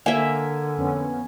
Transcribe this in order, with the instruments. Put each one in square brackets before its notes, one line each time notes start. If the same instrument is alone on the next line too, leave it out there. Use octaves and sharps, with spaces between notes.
[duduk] D3 [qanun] A#3 E5 [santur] G#5
[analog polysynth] F2 B3 C#4